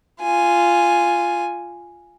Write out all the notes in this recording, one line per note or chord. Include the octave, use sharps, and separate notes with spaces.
F4 G#5